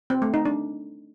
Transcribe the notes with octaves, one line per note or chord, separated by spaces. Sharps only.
C4
A3
D#4
D4